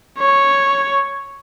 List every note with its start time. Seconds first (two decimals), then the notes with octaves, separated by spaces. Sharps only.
0.18 C#5